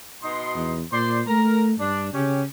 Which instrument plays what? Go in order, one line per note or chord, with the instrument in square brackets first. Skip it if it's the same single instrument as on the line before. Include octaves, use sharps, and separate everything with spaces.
[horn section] B2 D#4 C6
[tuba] E2
[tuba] A#2 [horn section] C5 D5 C6
[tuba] A3 [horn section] A#4 A#5
[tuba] G2 [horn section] D4
[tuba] C#3 [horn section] C#4 G4